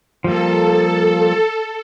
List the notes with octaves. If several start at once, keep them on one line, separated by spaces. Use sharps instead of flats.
F3 G3 A#3 A4